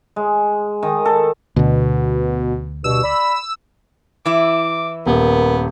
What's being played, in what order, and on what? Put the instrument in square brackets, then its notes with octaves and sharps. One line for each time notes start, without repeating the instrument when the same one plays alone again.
[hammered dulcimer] G#3
D#3
A4
[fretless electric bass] D2 D3 [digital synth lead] B2
[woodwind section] G2 B2 [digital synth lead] E6
[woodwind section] D5 B5
[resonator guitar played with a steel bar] E3 E4 [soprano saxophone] D6
[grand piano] D#1 [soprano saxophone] B3 [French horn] A#4